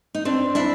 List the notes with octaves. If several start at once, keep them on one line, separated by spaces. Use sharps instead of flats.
D#4
C4 D4
D4 E4